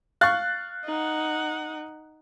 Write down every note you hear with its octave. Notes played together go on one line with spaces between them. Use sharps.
F5 C#6 F#6 A6
D#4 F#5